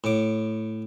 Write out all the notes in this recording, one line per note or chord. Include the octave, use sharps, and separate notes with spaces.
A2 D6